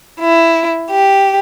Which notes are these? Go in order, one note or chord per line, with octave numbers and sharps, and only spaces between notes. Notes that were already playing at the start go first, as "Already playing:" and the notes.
E4
G4